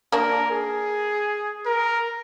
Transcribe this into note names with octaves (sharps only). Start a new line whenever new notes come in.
A#3 D4 A#4
G#4
A#4